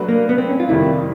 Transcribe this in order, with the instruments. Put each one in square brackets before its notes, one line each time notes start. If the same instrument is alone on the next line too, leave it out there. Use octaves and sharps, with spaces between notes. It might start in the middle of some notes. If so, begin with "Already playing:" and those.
Already playing: [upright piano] F#3 A3 D4 F#4 B4
[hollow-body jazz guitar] A#3
B3
C4
C#4
F4
[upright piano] F2 C3 D#3 G3 [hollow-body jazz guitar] E4